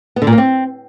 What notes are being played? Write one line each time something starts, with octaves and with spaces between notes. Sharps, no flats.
B3
D3
A#2
A#3
C4